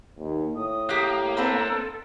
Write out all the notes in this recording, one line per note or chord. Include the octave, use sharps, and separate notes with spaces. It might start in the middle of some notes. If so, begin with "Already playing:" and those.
D#2
A2 D#6
A#3 G4 F#6
C4 D4 A4 B4